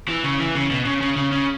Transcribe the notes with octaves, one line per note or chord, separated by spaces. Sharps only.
E3
C#3
E3
C#3
B2
C#3
C#3
C#3
C#3